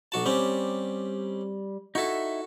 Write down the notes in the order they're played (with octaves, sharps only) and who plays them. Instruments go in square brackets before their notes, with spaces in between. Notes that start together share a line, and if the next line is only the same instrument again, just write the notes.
[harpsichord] B1 F#4 A5
[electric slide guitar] G3 [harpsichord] C4 C#4 G4
[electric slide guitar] D#4 E4 E5 [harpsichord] F#4 A4